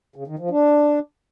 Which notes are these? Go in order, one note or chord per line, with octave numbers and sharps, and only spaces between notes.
C#3
D#3
F3
D4